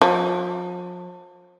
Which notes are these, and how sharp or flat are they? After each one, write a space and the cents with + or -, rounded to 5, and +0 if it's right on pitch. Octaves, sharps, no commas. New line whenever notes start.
F3 +40